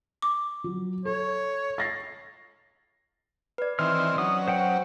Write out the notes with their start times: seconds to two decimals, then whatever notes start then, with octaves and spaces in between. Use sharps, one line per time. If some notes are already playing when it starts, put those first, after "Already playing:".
0.22 D6
0.64 F#3
1.05 A4 C#5
1.78 A6 A#6 C7
3.58 B4 D5
3.79 D#3 E3 C4 F6
4.18 F#3 C#4 D#6
4.48 C5 F#5 G5